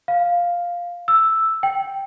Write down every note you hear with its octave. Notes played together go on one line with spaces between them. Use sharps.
F5
E6
G5